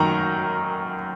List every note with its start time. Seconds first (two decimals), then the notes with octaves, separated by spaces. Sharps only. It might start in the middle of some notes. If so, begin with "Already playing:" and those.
Already playing: F#2 D#3 A#5 C#6